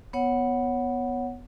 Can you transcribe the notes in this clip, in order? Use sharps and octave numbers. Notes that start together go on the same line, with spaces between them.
B3 C#5 F#5